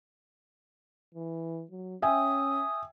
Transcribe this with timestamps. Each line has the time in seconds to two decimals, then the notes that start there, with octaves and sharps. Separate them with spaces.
1.15 E3
1.71 F#3
2.02 C#4 E5 G5 G#5 D#6